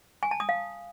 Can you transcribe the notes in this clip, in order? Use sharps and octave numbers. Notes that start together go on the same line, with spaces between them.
G#5
A5
D#6
F5